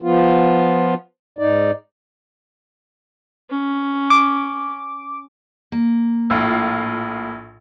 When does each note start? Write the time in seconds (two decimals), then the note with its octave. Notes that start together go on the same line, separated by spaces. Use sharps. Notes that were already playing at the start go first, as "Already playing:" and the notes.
0.02 F3 B3 F4
1.39 G#2 D#4 D5
3.51 C#4
4.10 D6
5.72 A#3
6.30 A#1 A2 F4